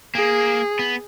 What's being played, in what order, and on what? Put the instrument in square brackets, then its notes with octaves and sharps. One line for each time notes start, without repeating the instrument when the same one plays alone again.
[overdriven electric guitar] A#3 [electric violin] G#4
[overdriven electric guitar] B3